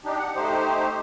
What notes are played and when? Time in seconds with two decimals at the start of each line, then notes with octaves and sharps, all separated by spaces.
0.04 D4 D#4 G4
0.19 F#5
0.36 A3 D#4 G4 C5